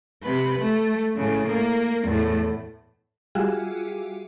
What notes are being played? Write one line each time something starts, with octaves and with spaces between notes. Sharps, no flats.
C3 B4
A3
A2 C#3
A#3
E2 A2
G3 F4 F#4 G#4 E5